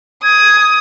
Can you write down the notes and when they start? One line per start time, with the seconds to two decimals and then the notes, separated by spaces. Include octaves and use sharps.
0.23 D#6 G#6